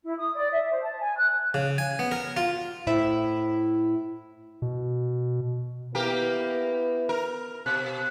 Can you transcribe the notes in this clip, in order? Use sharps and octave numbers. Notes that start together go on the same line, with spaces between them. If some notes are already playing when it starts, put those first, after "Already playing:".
E4
D#6
D5
E5
C5
A5
G#5
F#6
C#3
G#5
B3
A#4
F4
A2 E4 C5 E5
B2
A#3 B3 E4 G4 A#4 B4
A#4
B2 F#6